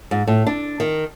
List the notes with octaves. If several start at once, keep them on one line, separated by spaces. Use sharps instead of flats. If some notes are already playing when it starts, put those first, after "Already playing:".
G#2
A2
D4
D#3